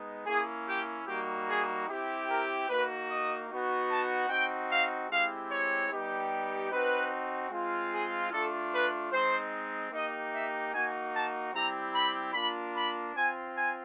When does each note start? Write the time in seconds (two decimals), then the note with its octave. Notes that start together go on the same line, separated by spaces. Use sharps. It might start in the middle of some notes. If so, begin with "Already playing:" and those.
Already playing: G#3 B3 D#4
0.26 A#3 C#4 E4 G#4
0.66 G4
1.06 G3 A#3 D#4 F#4 G4
1.48 G#4
1.87 C4 E4 G4
2.28 A#4
2.68 A#3 D#4 F#4 B4
3.08 D#5
3.48 B3 D#4 F#4
3.89 A5
4.29 C4 D#4 F#4 G5
4.69 F5
5.09 G#3 C4 E4 G4 F5
5.49 C#5
5.90 G3 B3 D#4 G4
6.70 C4 D#4 F#4 B4
7.51 G#3 C4 F4
7.91 G#4
8.31 A3 D4 F4 A4
8.72 B4
9.11 G#3 C4 D#4 C5
9.92 A#3 D#4 G4 D#5
10.33 E5
10.73 A#3 D#4 F#4 G#5
11.13 A5
11.53 G3 C4 E4 G4 A#5
11.93 B5
12.34 A#3 D4 F4 B5
12.74 B5
13.14 C4 F4 G#5
13.54 G#5